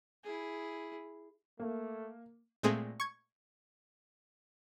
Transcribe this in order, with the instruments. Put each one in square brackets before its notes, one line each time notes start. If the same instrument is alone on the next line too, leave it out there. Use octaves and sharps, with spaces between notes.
[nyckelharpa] E4 G#4
[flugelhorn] A3 [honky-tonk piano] A#3
[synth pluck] A#2 G#3 A3 C4 G#4
C#6 G#6